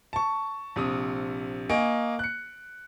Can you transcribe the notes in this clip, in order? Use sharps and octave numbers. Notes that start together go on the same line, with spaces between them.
A5 C#6
A#1 C3 D#6
A#3 D#5 G#5 C#6 D7
F#6 C#7